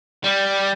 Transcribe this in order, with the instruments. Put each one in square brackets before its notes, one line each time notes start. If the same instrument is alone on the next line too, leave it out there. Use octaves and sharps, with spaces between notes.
[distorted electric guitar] G3